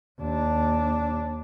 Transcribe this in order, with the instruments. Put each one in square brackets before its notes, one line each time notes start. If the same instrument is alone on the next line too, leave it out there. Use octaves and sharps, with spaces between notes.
[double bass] D#2 D4